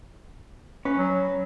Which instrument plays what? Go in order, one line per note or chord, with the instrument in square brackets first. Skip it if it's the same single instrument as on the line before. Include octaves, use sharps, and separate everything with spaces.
[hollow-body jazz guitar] C#4 B4
[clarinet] F#3